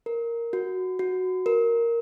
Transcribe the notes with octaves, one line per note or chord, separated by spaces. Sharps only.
A#4
F#4
F#4
A#4